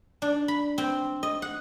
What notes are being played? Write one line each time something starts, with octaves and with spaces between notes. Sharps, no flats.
D4
B5
C4
D#5
F#5